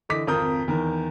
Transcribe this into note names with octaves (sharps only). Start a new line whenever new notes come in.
D3 E3 D#5 D6 B6
G#1 F2 F4 A#4 D#6 G6
E2 D#3 A#4